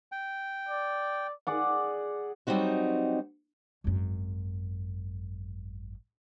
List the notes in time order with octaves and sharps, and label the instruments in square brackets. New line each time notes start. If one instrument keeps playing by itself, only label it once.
[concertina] G5
[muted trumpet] D5
[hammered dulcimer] G#4 D5 F#5
[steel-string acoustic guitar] F#3 G3 A3 C4 D#4 F#4
[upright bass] G#1 F#2